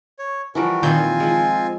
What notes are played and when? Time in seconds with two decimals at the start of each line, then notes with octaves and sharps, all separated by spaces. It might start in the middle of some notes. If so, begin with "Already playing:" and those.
0.19 C#5
0.55 E3 F3 G3 F#4 A#4
0.83 A#2 D#3 C4 F4 G#5 G6
1.20 F3 G#3